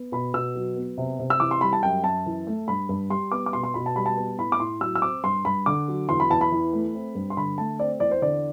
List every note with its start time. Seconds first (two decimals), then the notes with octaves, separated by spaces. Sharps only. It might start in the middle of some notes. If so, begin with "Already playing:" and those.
Already playing: B3
0.12 B2 B5
0.34 B2 E6
0.55 F#3
0.76 B3
0.98 C3
1.19 C3
1.30 E6
1.40 E3 D6
1.51 C6
1.61 G3 B5
1.73 A5
1.83 F#2 G5
2.04 F#2 A5
2.26 E3
2.47 A3
2.68 G2 B5
2.89 G2
3.10 G3 C6
3.32 B3 D6
3.46 D6
3.53 B2 C6
3.63 C6
3.74 B2 B5
3.86 A5
3.96 G3 B5
4.06 A5
4.17 B3
4.39 A2 B5
4.52 D6
4.60 A2 C6
4.81 F#3 E6
4.95 E6
5.02 C4 D6
5.23 G2 C6
5.45 G2 B5
5.66 D3 D6
5.88 F#3
6.09 E2 C6
6.20 B5
6.30 E2 A5
6.41 B5
6.52 E3
6.73 A3
6.94 C4
7.15 G2
7.30 C6
7.37 D3 B5
7.58 A3 A5
7.79 C4 D5
8.00 E2 D5
8.11 C5
8.22 D3 D5